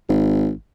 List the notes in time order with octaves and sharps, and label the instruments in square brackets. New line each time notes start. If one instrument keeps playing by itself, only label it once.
[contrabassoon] G#1